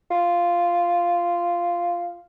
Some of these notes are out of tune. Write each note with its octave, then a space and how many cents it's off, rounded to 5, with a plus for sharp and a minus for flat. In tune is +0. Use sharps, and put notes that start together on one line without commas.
F4 -5